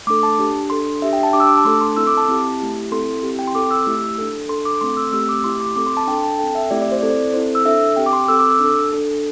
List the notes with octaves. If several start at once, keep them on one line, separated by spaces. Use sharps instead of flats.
A3 D4 A4 D6
A5
D4 G4
D4 A4 C6
D4 G4 E5
G5
A5
D4 G4 D6
E6
D6
A5
A3 D4 A4 C6
C6
C4 E4 A4 E6
D6
A5
C4 E4 G4
A3 E4 G4
C4 E4 A4 C6
C4 E4 G4
G5
C6
C4 A4 D6
E6
A3 E4 G4
D4 A4
D4 A4 C6
D6
A3 C4 A4 C6
E6
A3 C4 G4 E6
D6
A3 E4 G4 C6
D6
C4 A4 D6
C6
A5
D4 A4 G5
A5
C4 A4 G5
E5
A3 C4 E4 G4 D5
D5
C5
C4 E4 A4 D5
C5
C4 E4 A4 C5
E6
D4 A4 E5
C4 G4 G5
D6
C6
C4 A4 E6
D6
E6
D4 A4
D4 A4